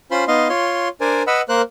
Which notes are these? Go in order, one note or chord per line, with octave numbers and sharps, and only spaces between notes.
C#4 F4 C5 B5 C6
B3 D#4 D#5 F5 C6
F4 C#5 C6
D4 A#4 C5 D5 G#5
B4 D#5 F#5 B5 E6
A#3 A#4 C5 F#6